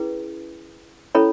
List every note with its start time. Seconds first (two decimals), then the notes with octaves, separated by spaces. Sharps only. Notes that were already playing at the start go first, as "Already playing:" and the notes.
Already playing: C#4 E4 G#4 B4
1.15 C#4 E4 A4 C#5 B5